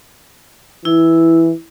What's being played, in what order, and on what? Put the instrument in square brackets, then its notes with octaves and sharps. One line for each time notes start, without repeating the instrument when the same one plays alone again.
[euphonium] E3 [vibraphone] E4